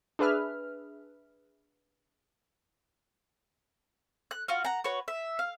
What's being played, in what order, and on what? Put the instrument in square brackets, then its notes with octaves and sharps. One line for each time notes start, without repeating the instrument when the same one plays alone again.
[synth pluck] D4 G#4 B4 E5 F6
[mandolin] F#6
F4 F#4 F5
F#5 A#5
F#4 B4 C#5
E5
F5